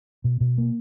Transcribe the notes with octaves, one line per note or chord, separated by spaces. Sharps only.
B2
B2
A#3